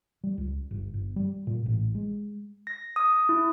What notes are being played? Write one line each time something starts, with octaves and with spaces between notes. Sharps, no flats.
G3
C#2
G1
G1
G3
A#2
A1
G#3
A#6
D#6
D#6
E4